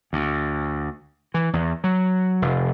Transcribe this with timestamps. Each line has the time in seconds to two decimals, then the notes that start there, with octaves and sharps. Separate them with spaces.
0.13 D2
1.34 E3
1.53 E2
1.84 F#3
2.42 F1